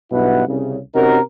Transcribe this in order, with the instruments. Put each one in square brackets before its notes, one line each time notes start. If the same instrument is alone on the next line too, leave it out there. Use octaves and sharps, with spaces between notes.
[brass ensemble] B1 G2 B2 E4 B4 F#5
C2 C#3
C3 C#4 D#4 F#4 A#4